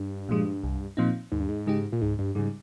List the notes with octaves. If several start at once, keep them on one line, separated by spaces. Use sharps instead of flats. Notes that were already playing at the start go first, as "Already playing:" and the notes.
Already playing: G2
A#2 F3 G#3
C2
A#2 F3 C4 D#4
D#2 G#2
G2
G#2
C#3 G#3 D#4 G4
A#2
C#2 G#2
G2
G#2 C#3 G3